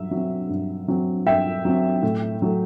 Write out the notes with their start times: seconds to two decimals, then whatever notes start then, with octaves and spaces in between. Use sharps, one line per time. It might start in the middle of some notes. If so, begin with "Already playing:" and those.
Already playing: G2 F#3 E5
0.11 F#3 C4
0.49 G2
0.88 F#3 C4
1.27 G2 E5 G5
1.65 F#3 C4
2.03 A2
2.42 F#3 A3